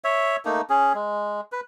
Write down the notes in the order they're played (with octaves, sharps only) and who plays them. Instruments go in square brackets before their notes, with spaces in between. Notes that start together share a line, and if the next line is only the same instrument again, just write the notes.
[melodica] C#5 E5
A3 A#3 D#4
C#4 G#4
G#3
B4